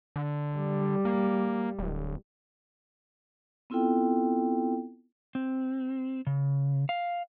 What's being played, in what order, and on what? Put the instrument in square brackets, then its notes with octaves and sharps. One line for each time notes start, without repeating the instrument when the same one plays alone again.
[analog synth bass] D3
[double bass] G3
[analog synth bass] A#3
D1
[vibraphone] B3 C4 E4 F4 A4 G5
[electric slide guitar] C4
C#3
F5